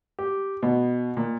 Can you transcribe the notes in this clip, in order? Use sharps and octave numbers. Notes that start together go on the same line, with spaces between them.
G4
B2
A#2